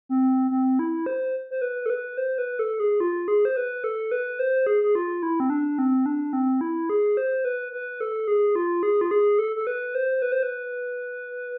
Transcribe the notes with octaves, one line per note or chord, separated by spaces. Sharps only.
C4
C4
E4
C5
C5
B4
A4
B4
C5
B4
A4
G#4
F4
G#4
C5
B4
A4
B4
C5
G#4
G#4
F4
E4
C4
D4
C4
D4
C4
E4
G#4
C5
B4
B4
A4
G#4
F4
G#4
F4
G#4
A4
A4
B4
C5
B4
C5
B4